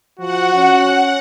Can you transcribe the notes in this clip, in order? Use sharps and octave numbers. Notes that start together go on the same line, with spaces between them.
F3 F#4 F#5
C#4